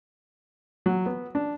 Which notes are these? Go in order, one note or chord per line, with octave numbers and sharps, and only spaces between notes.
F#3
B3
D4